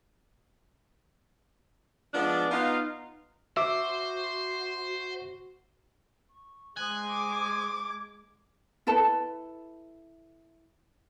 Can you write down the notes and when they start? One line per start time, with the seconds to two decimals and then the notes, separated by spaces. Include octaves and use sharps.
2.14 F3 G#3 B3 D4
2.51 B3 D#4 F4 B4 F5
3.57 F#4 C5 E5 D6
6.30 C#6
6.77 G#3 C5 G#5 C6 D#6 F#6
7.09 D6
8.87 E4 A4 B4 A5